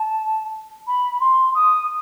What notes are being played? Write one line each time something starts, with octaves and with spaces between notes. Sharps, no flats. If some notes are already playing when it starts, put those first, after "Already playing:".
Already playing: A5
B5
C6
D#6